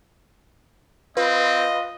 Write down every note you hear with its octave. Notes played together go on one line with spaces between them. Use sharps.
C4 F4 B4 D#5